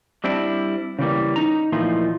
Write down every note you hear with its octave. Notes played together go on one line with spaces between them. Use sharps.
G3 C4 D4 E4
C#3 E3 G3 A#3
D#4 A#5
A#2 E3 F3 A3 D#4 F4